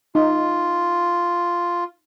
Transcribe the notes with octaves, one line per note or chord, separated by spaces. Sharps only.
D#4 F4